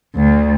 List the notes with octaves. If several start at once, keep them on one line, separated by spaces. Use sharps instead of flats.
D2